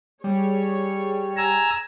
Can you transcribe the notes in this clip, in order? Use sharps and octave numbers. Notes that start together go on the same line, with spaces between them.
G3 G#4 C#5
G#5 A#5 E6